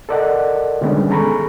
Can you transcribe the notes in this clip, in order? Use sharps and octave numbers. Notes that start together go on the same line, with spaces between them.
A4 A#4 D5 D#5 F#5
D3 D#3 G3 G#3 B3 C#4
G#4 A4 A#5 B5 C#6